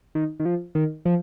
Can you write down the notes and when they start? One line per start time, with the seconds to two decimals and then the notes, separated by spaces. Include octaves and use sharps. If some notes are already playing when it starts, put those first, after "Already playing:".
0.15 D#3
0.40 D#3
0.45 F3
0.75 D#3
1.05 F3